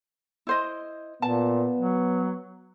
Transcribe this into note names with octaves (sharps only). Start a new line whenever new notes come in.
E4 C5 D#5
A#2 B3 A5
F#3